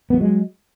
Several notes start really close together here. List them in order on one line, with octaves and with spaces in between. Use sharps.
B3 F3 F#3 G#3